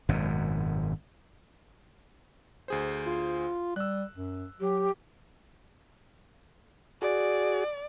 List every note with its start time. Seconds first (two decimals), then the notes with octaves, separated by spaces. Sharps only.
0.09 G#1 F#2 B2
2.68 D2 G#4 C5
3.06 F4
3.76 G3 E6 F#6
4.16 F#2
4.60 F#3 G4
7.02 F#4 G#4 D5